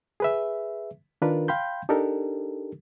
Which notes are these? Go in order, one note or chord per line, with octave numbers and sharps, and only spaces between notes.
G#4 B4 E5
D#3 D4 F4 A#4 B4
F5 G5 B5 C6 G6
D4 D#4 G4 A4 A#4